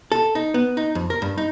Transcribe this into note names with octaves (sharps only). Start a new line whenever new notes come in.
A4
D#4
B3
D#4
F2
A#4
G2
D#4